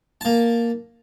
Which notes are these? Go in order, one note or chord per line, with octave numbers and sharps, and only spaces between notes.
A#3 A5